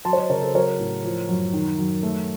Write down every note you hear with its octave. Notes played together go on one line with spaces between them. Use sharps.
F#3 A5 C6
C#5
C5 D#5
C#3 A#4 C#5
A4 C5
F#3 A#4 C#5
A2
F3
F#2
D#3
F#2
A3